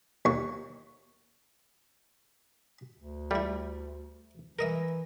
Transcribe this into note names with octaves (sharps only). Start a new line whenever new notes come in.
D#2 C#6
D2
G3 A3 E4
E3 A#4 D#5 E5